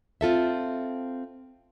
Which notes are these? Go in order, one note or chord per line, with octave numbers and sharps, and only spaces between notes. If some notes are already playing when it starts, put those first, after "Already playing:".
C4 F4 A4 E5